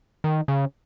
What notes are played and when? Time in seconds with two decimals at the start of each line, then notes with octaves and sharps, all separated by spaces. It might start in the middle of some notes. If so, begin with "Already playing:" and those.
0.24 D#3
0.48 C#3